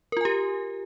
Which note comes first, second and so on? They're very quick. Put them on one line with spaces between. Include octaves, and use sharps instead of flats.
A#4 F4 G#5 G4